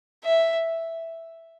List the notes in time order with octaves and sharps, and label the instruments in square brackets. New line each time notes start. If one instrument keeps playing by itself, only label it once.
[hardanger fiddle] E5